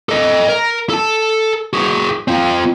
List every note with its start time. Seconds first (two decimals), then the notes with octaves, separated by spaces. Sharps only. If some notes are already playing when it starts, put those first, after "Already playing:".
0.09 A4 D#5
0.49 A#4
0.90 A4 A5
1.73 F#4 G#4
2.28 C4 F4